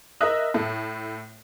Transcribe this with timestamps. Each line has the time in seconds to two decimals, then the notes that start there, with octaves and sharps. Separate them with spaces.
0.21 A#4 D#5 E5 D#6 F#6 A#6
0.54 A2 A3 A4